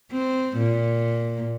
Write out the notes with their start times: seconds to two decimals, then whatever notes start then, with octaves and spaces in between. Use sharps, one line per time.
0.11 C4
0.58 A#2